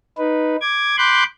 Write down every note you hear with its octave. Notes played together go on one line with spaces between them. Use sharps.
D#4 B4
D6 G#6
B5 C6 D6 F#6 G6